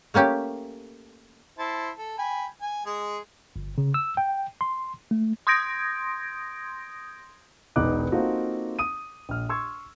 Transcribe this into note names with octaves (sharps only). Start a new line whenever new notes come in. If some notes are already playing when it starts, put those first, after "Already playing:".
A3 A#3 C#4 G4
E4 C5 A5
A4
G5 G#5 B5
G#5
G#3 G#4
G1
C#3
E6
G5
C6
A3
C6 D#6 G6 G#6 A#6 D7
E1 B1 B3 D#4 D6 F#6
A#3 C4 D#4 F4 F#4 A4
D#6 D#7
A#1 F6
C6 C#6 E6 G#6